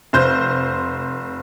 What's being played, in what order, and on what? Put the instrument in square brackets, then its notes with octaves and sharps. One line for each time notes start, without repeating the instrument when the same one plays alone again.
[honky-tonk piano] F1 C5 G6